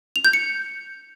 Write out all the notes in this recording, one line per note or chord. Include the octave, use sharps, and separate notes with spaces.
F7
G6
C#7